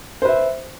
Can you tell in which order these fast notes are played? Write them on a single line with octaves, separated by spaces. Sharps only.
C5 B4 E5